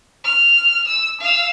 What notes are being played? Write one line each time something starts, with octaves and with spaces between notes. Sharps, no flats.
F6
E6
F5 E6